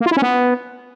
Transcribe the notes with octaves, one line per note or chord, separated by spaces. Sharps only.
A#3
F4
E4
C#4
B3